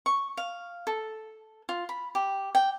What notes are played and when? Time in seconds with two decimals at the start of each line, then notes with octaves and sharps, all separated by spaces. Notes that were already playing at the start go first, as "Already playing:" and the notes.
0.06 C#6
0.37 F5
0.87 A4
1.69 F4
1.89 B5
2.15 G4
2.55 G5